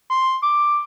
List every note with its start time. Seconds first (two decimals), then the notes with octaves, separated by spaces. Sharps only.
0.11 C6
0.43 D6